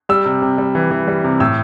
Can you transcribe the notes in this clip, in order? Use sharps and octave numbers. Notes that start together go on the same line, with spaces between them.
G3 E6
C3
C3
G3
E3
E3
G3
C3
A2 E6